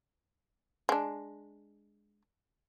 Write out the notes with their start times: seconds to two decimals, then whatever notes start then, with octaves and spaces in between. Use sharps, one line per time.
0.89 G#3 D4